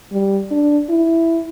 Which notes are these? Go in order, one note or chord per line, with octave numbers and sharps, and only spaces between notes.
G3
D4
E4